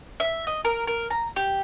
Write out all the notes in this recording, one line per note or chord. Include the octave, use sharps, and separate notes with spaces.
E5
D#5
A#4
A#4
A#5
G4